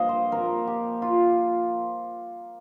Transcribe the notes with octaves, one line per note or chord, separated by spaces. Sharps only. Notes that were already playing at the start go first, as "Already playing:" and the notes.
Already playing: G2 F3 A#3 D#5 F5
C5
A#2 F3 C4 A#4
G4
F4